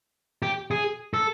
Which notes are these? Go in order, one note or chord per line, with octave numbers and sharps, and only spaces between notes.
G4
G#4
A4